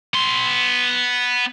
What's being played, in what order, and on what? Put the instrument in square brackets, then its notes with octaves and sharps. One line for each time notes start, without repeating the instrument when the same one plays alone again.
[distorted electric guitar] B3 C6